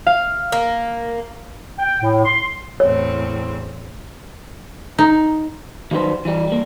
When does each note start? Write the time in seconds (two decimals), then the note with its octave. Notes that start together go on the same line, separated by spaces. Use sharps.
0.07 F5
0.52 A#3
1.79 G5
2.02 A2
2.25 C6
2.80 E2 A2 C4 C#5
4.98 D#4
5.91 D#3 F#3 G3 D#4 B4 C5
6.25 E3 G3
6.47 G3 A#3